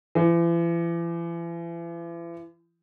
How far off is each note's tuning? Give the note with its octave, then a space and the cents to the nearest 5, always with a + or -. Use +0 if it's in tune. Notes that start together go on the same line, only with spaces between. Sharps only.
E3 +40